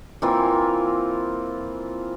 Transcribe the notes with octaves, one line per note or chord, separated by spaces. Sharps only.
E3 A#3 C4 F4